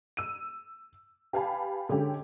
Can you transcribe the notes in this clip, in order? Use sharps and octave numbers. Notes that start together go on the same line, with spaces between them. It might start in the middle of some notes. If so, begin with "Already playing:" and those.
E6 D#7
G4 B4 F5 G#5 A5 B5
D3 G#3 C#4 G4 A4